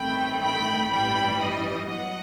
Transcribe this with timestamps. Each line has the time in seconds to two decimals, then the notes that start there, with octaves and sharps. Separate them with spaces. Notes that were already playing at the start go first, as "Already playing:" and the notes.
Already playing: A1 G2 D#3 A3 C4 G5 B5
0.42 G5 B5
0.91 A1 G2 E3 G3 G5 B5
1.41 D#5
1.89 F#3 B3 D#5 F#5